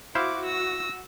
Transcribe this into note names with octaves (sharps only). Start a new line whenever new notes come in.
E4 F#4 C5 F5 D6
E6 A#6